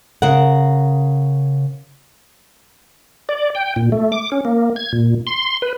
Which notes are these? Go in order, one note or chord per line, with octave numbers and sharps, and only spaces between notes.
C#3 A#4 F#5
D5
G5
A#2
A3
D6
C#4
A#3
G#6
A#2
C6
B4